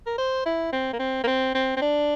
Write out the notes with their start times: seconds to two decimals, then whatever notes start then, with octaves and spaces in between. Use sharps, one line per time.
0.06 A#4
0.18 C5
0.46 E4
0.73 C4
0.93 A#3
0.99 C4
1.24 A#3
1.27 C4
1.55 C4
1.77 C4
1.81 D4